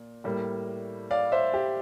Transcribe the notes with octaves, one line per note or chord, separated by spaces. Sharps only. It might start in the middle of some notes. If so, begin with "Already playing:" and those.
Already playing: A#2
A2 G3 A#3
D5 F5
C5 E5
G4